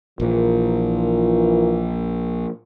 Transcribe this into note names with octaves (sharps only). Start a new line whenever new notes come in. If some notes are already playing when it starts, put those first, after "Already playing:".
A#1 A#2 E3 F4 A#4